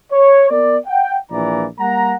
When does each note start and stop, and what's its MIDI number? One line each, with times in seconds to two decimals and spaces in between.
0.12 0.48 73
0.50 0.78 59
0.50 0.78 70
0.50 0.78 74
0.86 1.15 78
0.86 1.15 79
1.32 1.66 34
1.32 1.66 46
1.32 1.66 52
1.32 1.66 74
1.32 1.66 82
1.79 2.14 55
1.79 2.14 58
1.79 2.14 78
1.79 2.14 82